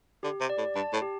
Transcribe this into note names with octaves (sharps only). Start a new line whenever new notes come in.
D3 G4
C3
D5
A2
G2 A5
A2
G4